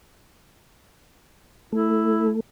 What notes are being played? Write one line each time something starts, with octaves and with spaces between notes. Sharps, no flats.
A3 E4